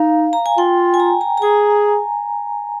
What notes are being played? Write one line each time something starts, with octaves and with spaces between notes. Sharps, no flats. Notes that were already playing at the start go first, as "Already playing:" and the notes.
Already playing: D#4 F5
A#5
G#5
F4 G5
G#5
A#5
A#5
A#5
G#4 G#5